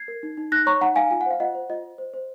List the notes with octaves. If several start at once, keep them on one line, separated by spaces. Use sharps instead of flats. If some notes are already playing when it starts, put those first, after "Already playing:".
Already playing: G#6 C7
A#4
D#4
D#4
D#4 F#6 A#6
C#5 A#5 C#6
D#4 F#5 A#5
D#4 F5 G#5
F4 G#5
F#5
C5 F5
F4 D#5 F#5
C5
F4 D#5
C5
C5
C5